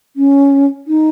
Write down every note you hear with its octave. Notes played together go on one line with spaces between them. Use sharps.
C#4
D#4